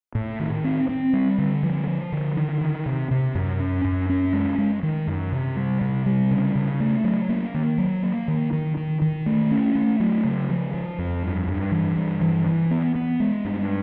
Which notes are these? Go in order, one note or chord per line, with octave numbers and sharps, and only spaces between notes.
A2
D#3
C4
C4
G3
D3
F3
F3
D3
D#3
D#3
C3
C3
F#2
C#4
F#2
C#4
G#3
G#3
D#3
F#2
C3
G3
C3
G3
C#3
C#3
A3
F#3
A#3
D#3
F#3
A#3
D#3
D#3
D#3
D#3
A3
C#4
A3
F#3
C#3
F3
F3
F2
G2
G2
E3
G2
E3
E3
B3
B3
G#3
G2